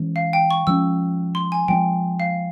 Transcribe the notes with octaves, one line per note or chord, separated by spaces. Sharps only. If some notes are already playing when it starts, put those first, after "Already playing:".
Already playing: E3 G#3 C#4
F5
G5
C#6
F3 G#3 C#4 E6
C6
G#5
F3 G#3 C4 G5
F5